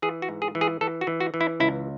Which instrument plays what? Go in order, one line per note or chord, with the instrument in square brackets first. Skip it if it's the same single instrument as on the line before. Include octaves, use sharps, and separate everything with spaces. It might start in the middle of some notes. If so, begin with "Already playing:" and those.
[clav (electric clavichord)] E3 G#4
F#4
G#2
G#4
E3
G#4
E3 A4
F#4
E3
F#4
E3
E4
C#2 E4